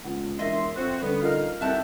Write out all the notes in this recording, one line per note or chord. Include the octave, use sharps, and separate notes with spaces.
C#2 B3 F4 F#5
E1 F#2 B3 D#5 E5 C6
F2 C4 F#4
D3 G3 B3 C#4
D#4 F4 A#4 F5
C2 D#3 C4 G4 A4 E5 F#5 A5